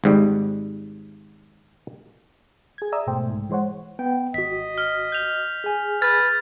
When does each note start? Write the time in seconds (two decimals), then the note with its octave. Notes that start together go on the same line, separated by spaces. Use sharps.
0.04 G#1 G#2 G3
2.78 G#4 G#6
2.92 D5 E5 A#5 D#6 E6
3.07 G1 G#2 B2 A3 C5 G5
3.30 C2 G#2
3.50 E3 G#3 C5 C#5 F#5
3.99 B3 G5
4.34 G#1 F#4 D#5 B6
4.78 F6
5.12 G6 F7
5.64 G#4 G#5
6.02 B4 F6 G#6 A6